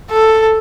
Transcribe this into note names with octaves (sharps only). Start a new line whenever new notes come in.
A4